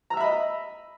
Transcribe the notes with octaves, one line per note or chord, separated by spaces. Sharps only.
D#5 E5 A#5 B5 E6